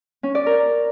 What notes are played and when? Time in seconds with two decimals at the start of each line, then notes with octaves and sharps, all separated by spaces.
0.23 C#4
0.35 D5
0.46 A#4